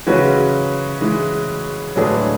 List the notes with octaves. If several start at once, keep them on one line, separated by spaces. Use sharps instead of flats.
C#3 E3 F#3 G#3 C#4 F#4 B4
E3 G#3
A2 D3 F#3 G#3 D4 G#4 B4